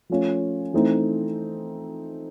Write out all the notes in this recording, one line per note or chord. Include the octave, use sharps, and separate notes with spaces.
F3 A3 C#4 F4
E3 A3 C4 D#4